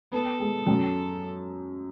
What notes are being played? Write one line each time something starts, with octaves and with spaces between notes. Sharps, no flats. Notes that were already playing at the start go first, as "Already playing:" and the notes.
B3 A4
G#3
F#2